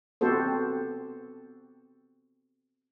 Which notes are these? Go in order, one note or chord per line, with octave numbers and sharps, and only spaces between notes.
B3 C4 F#4 G4 A4 C5